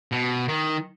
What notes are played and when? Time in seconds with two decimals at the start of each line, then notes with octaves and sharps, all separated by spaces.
0.12 B2
0.48 D#3